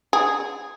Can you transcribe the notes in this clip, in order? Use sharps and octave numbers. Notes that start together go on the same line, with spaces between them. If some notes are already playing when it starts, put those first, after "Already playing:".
G#4